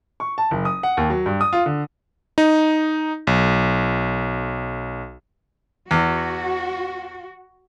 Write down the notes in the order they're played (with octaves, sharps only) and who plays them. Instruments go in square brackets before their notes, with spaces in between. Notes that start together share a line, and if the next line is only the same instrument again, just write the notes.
[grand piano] C#6
A5
F#1
D#6
F#5
D#2
F#3
G2
D#6
F4
D3
[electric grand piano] D#4
B1
[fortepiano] E2 [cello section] F#4